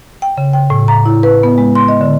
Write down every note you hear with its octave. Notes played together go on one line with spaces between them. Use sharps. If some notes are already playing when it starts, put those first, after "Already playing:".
G5
C#3
G5
A2
A#5
E4
B4
B3
G#3
C6
D#5
D3